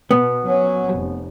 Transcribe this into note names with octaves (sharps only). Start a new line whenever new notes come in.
B2 B3
F#3 C#4
F1